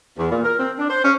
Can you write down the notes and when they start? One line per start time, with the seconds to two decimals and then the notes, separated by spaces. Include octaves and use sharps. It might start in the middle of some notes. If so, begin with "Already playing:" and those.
0.17 E2
0.30 A#2
0.42 A#4
0.58 C4
0.78 D4
0.89 C5
1.03 C#4